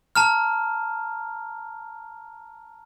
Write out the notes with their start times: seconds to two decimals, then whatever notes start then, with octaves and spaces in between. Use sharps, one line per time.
0.15 A5 A#5 F6